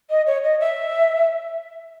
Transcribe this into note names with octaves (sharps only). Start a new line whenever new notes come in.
D#5
C#5
D#5
E5